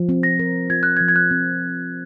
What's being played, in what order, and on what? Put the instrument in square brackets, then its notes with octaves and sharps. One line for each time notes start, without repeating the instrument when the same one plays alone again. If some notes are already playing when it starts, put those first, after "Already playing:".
Already playing: [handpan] F3
C4
[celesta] A#6
[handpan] A#4
[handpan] F4 [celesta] G#6
[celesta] F#6
G#6
[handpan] F3
[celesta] G#6
F#6
[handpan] C4